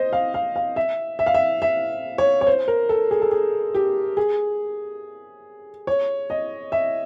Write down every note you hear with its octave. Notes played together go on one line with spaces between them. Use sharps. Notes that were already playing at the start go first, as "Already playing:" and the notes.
Already playing: C5 D#5
F5
F5
F5
E5
E5
F5
E5
E5
C#5
C#5
C5
A#4
A4
G#4
A4
G#4
G4
G#4
C#5
D#5
E5